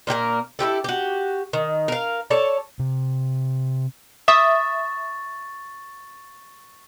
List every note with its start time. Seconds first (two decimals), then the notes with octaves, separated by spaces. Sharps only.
0.07 A#2 A#3 G4 A#4
0.59 E4 F4 G4 A4
0.84 F#4 G4
1.53 D#3
1.88 A#4 F5
2.30 A4 C#5 D5 A5
2.79 C3
4.28 E5 C#6 D#6 A6